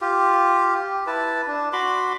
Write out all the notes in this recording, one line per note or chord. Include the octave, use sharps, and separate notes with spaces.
F4 G4
G4
E4 B4 A5
D4
F#4 B5 C6 D6